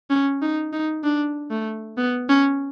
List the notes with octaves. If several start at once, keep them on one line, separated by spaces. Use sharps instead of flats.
C#4
D#4
D#4
D4
A3
B3
C#4